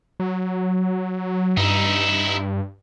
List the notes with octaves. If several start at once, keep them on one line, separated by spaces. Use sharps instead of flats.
F#3
G2 D#4 E4